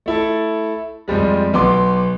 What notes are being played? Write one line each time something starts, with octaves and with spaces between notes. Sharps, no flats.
A3 E4 A4
F2 F3 G3 G#3
B1 B3 C6 D6